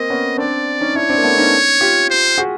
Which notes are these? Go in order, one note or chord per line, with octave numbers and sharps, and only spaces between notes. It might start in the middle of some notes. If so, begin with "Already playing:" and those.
Already playing: A#3 C4 D#5
B3 C#4
C4 D4 D5
C#4 D#4
D4 E4 C#5
C4 D4
A#3
A3 B3
C#4 D#4
F4 G4
C5
F#4 G#4